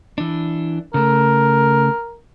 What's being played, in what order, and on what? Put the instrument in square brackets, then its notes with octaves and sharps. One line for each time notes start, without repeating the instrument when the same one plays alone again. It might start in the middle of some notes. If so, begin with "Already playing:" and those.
[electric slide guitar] E3 D4
[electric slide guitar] C#3 A3 [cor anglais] A#4